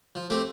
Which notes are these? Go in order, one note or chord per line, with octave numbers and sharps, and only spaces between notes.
F3
A3 C4 G4